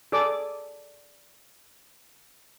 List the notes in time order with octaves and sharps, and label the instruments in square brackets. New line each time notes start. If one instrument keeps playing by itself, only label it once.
[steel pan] G#4 A4 D5 D6